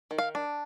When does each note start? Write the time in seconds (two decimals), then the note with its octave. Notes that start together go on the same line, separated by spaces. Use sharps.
0.11 D#3
0.18 F5
0.35 D4